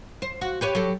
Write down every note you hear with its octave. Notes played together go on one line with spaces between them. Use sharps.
C5
F#4
G4 B4 C#5
F#3 G4 A4